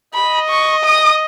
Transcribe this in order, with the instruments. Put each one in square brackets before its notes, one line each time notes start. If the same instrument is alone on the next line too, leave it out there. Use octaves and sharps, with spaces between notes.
[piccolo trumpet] D#5 [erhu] B5
[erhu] C#6
D#6